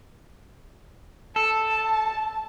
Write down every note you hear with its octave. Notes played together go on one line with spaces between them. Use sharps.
A4 A5